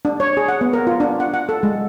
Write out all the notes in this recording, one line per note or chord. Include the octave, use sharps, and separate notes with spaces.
D4
C#5
G#4
F#5
B3
A#4
F4
D4
F#5
F#5
A4
G#3